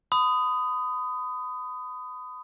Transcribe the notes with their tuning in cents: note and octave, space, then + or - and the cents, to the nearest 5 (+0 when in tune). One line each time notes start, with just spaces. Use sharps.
B5 +35 D#6 +0